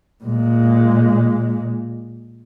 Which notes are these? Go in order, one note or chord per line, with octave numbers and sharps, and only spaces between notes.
A#2 G#3